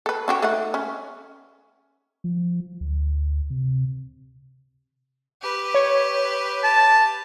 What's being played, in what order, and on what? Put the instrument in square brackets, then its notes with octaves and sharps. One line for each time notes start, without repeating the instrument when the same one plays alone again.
[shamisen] A4 B4
C#4 F#4 G4
A3 D#4 F#5
C#4
[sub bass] F3
D2
C3
[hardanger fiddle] G4 B4
[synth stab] C#5
[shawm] A5